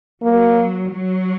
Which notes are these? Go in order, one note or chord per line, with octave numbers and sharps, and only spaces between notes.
F#3 A#3
F#3